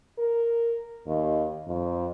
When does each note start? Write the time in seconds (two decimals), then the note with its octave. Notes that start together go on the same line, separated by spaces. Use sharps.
0.18 A#4
1.07 D#2
1.67 F2